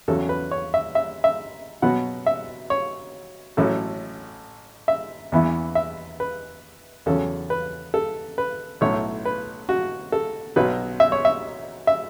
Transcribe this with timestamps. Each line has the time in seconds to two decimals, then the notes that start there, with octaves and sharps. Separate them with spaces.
0.08 E2 C#3 F#3 C#4 A4
0.29 B4
0.51 C#5
0.74 E5
0.95 E5
1.24 E5
1.82 B2 F#3 B3 F#5
2.26 E5
2.70 C#5
3.57 A1 A2 F#3 A4
4.88 E5
5.32 E2 E3 B3 E4
5.75 E5
6.20 B4
7.06 E2 C#3 F#3 C#4 A4
7.50 B4
7.94 A4
8.38 B4
8.81 B1 A2 A3 E4 C#5
9.25 B4
9.69 F#4
10.12 A4
10.56 B1 B2 F#3 B4
11.00 E5
11.12 C#5
11.25 E5
11.87 E5